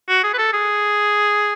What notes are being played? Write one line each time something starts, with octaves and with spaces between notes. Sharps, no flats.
F#4
G#4
B4
A4
G#4